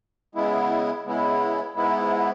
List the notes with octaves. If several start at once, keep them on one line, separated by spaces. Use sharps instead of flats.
C#3 G#3 B3 E4
C#3 G#3 B3 E4
G#2 G#3 B3 E4